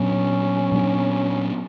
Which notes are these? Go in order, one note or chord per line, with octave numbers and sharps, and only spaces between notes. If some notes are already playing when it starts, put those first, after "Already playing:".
Already playing: A#2 F#3 B3 C#4 D4
A#2 F#3 B3 D4